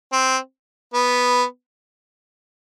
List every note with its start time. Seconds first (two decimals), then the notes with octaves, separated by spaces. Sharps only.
0.12 C4
0.94 B3